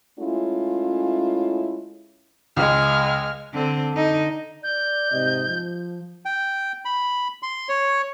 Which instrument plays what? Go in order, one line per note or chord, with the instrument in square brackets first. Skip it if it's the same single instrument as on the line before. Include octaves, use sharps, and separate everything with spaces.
[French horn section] G#3 A3 C#4 E4 F4
[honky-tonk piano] C#2 [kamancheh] G#3 F6
[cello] D3 C4
D3 D#4
[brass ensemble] D5 [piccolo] G6
[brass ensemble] G#2 C3 D#5
F3
[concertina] G5
B5
C6
C#5